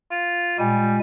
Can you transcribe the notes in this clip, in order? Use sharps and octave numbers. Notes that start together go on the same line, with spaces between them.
F4
A#2 G3 G#3 G#5